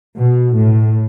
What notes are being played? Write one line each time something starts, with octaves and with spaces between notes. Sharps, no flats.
B2
A2